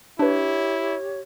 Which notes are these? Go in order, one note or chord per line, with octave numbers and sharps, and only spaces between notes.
D4 E4 G4 B4 C#5